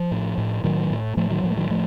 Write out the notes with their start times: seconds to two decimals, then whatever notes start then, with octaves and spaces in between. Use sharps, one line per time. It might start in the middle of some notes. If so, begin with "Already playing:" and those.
Already playing: F3
0.11 A2
0.38 A2
0.64 A2 D#3 F#3
0.91 A2
1.17 A2 F3 A3
1.30 D#3 F#3
1.44 A2 F3
1.51 A3
1.57 D#3 F#3
1.70 F3 A3